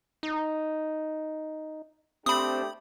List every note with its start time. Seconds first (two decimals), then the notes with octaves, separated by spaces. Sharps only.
0.23 D#4
2.26 A3 C4 D4 G4 B5 D#6